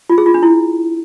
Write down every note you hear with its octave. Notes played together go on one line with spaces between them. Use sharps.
F4
G#4
F4
D4
E4